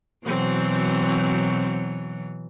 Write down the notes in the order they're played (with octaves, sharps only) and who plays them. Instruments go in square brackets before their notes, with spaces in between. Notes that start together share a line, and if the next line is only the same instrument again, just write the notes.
[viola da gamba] B2 E3 F#3 [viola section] C4 F#4